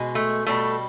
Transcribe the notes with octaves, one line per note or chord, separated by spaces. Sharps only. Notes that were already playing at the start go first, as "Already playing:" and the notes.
Already playing: B2 G#3
A3
B2 G3 A3